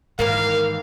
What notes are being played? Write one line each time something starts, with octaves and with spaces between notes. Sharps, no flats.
G#2 D#3 E3 A#3 A#4 F5